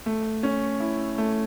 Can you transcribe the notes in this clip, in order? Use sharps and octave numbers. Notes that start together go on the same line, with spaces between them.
A3
C#4
E4
A3